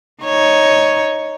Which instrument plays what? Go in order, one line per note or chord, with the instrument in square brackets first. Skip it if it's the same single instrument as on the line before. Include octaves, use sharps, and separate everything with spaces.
[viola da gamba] D#4 C#5